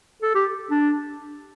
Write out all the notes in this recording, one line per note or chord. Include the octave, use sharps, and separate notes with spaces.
A4
G4
D4